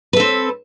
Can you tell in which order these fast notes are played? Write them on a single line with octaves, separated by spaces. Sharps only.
B4 A4 C4